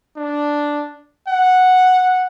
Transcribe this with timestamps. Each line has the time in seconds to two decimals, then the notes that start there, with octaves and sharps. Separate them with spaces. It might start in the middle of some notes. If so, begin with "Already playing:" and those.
0.17 D4
1.28 F#5